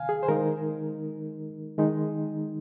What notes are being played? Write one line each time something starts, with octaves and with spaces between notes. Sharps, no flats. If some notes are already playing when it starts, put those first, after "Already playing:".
Already playing: C3 D#3 F5 G#5
G#4
C5
D#3 G#3 D#4 A#4
D#3 G#3 D#4